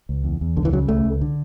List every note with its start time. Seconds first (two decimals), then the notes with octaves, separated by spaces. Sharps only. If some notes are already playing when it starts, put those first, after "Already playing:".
0.09 C#2
0.24 E2
0.41 E2
0.57 C#2 D3
0.65 E3
0.73 C#3 F#3
0.88 C#2 A3
1.05 C#2
1.21 D3